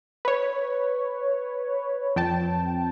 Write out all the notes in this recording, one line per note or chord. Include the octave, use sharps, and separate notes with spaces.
B4 C#5
F2 G5 A5